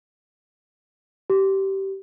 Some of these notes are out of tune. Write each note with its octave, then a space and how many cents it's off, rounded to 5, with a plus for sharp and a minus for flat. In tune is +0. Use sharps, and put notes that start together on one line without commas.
G4 -20